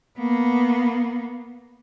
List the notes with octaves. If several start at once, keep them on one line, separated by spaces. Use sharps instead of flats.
A#3 B3